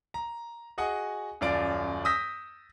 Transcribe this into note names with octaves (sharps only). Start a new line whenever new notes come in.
A#5
F#4 G#4 D#5 F#5 G#5
D#1 F#2 F4 D5 D7
D#6 E6 G6 A#6 B6